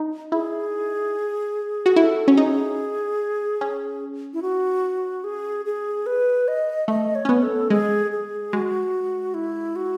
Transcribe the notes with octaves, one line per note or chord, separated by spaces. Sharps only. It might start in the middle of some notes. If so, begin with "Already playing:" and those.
Already playing: D#4
E4 G#4
F#4
E4 A4
C#4 F#4
D#4 G#4
C#4
E4
F#4
G#4
G#4
B4
D#5
A3 D#5
C#5
C#4
B3
A4
G#3 G#4
G#4
G#3 F#4
E4
F#4